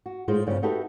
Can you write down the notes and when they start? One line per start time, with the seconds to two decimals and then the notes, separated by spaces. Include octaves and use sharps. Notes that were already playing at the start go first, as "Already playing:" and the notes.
0.06 F#4
0.28 A2 G#3 D#4 F4 C5
0.46 D2 G2 C#3 F3 C4 C#4
0.62 D#4 F#4 G4 A4 B4 E5